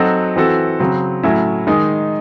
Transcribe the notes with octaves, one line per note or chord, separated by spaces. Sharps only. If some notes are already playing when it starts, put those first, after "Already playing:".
Already playing: F#3 C4 D#4 F#4 A4
E3 C4 F#4 A4
C#3 F#3 C4
A2 F#3 C#4 E4
D#3 G#3 D#4 G#4